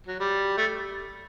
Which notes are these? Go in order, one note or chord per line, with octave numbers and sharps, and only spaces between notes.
F#3
G3
A3